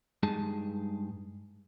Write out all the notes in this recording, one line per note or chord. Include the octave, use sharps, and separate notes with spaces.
G2 G#3 D#4 G#4 A5